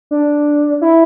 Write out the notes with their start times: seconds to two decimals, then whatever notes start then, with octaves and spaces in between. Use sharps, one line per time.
0.11 D4
0.81 E4